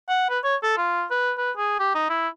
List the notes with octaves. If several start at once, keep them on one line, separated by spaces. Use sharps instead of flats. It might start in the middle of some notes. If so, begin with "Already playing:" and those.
F#5
B4
C#5
A4
F4
B4
B4
G#4
G4
D#4
E4